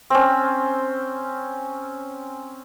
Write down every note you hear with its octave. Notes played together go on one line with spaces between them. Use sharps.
C4 C#4